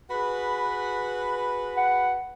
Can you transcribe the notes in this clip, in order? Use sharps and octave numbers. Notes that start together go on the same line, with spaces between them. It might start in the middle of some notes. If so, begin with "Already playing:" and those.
F#4 G#4 B4
F#5